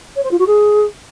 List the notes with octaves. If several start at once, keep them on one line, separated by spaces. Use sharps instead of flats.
C#5
C5
F4
F#4
G#4